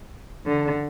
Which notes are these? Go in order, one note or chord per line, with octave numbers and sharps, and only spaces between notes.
D3